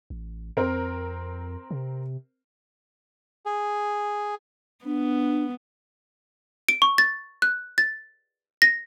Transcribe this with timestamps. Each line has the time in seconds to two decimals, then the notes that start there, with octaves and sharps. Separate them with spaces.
0.10 A1
0.57 F2 C4 A#4
1.71 C3
3.46 G#4
4.85 B3 D4
6.69 D7
6.82 C#6
6.98 A6
7.42 F#6
7.78 A6
8.62 A#6